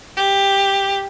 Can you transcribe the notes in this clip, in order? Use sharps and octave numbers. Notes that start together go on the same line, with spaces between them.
G4